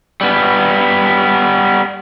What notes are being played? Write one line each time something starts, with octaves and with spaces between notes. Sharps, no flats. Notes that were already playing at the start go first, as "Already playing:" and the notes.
G3 B3